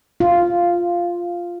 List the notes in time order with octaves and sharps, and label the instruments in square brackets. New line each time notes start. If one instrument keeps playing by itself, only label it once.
[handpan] F4